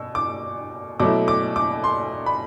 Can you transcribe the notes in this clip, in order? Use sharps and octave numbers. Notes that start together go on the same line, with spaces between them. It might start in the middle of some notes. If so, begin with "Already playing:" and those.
Already playing: B2 E6
D6
B2 F#3 A3 E4 D6
D6
D6
C6
B5